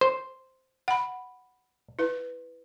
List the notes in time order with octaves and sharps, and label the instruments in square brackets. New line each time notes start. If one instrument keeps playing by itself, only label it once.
[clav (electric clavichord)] C5
[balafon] F#5 B5
E4 B4